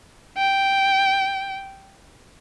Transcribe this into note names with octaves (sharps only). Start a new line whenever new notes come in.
G5